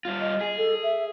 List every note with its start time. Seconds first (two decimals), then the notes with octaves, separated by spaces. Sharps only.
0.05 G3 F4
0.21 D#5
0.41 G#4
0.57 A4
0.83 E5